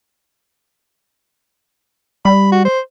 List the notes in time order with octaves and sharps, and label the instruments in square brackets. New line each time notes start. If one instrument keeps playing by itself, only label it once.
[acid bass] G3 [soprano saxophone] B5
[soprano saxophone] F#4
C5